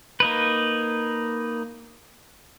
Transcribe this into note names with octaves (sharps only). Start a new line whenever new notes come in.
A#3 D#4 B4